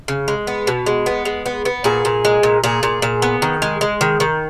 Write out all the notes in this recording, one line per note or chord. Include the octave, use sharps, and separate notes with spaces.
C#3
G#3
B3
B2
G#3
B3
G#3
B3
B3
A#2 G#4
A#2
G#3
A#2
A#2 G#4
A#2
A#2
B3
D#3
G#3
G#3
D#3
D#3